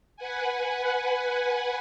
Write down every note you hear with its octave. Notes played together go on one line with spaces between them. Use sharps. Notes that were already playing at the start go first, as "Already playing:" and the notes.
B4 F#5 G#5